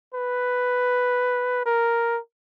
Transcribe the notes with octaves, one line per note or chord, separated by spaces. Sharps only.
B4
A#4